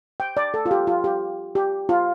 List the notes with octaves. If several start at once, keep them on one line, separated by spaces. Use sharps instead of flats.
G5
D5
A4
F4
G4
F4
G4
G4
F4